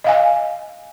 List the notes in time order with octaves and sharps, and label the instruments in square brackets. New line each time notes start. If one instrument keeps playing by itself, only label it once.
[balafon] D#5 F5 G#5